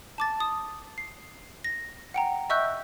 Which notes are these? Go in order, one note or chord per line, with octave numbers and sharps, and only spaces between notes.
A5 D6 A6
D#6
C7
A#6
F#5 G5 A#5
D#5 E5 C#6 E6 F#6 G6